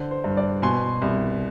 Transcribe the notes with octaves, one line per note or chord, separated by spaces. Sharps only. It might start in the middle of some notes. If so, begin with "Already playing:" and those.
Already playing: D3 C5
C5
G2
D5
B2 G#5 C6
C2